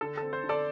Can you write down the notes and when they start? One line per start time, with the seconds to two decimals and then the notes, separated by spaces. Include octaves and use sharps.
0.01 D3 A4
0.17 C4 A4
0.33 C5
0.44 D3
0.49 A4 D5